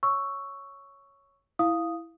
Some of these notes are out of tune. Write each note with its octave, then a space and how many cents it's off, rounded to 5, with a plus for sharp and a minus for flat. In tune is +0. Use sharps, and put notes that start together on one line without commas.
C#5 +0 C#6 +5 E6 +0
E4 +0 F5 +0 D#6 +0